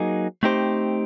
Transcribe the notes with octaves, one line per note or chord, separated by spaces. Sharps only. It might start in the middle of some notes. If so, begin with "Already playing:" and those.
Already playing: F#3 A#3 D#4 G#4
A3 C4 D#4 G4 C5